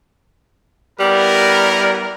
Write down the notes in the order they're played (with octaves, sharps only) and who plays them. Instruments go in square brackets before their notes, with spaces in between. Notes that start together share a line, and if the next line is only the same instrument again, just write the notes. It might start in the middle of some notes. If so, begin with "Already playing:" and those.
[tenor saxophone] G3 [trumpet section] B3 E4 A#4